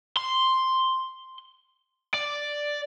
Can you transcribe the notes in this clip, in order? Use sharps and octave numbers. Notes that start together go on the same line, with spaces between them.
C6
D5